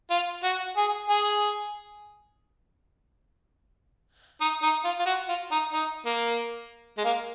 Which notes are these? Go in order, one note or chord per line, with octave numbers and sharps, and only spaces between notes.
F4
F#4
G#4
G#4
D#4
D#4
F4
F4
F#4
F4
D#4
D#4
A#3
G#3
A#3